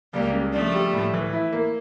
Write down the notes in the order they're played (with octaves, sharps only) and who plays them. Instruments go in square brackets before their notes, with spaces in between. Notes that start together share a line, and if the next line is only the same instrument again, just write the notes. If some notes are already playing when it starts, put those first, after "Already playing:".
[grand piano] C#2 [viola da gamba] G3 A#3
[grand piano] C#3
[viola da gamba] F3 A3 [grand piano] D4
[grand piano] G3
A2
E3
E4
A#3